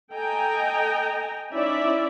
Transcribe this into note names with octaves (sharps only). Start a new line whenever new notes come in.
A4 D#5 G5 G#5 A#5
C#4 D#4 E4 C#5 D5 E5